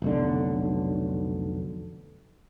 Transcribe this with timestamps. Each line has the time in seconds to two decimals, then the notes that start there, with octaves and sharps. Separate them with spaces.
0.02 F1 B1 D3